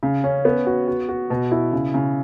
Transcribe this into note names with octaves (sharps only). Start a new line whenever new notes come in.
C#3
C#4
B3
F#4
F#4
F#4
B2
E4
C#3
C#3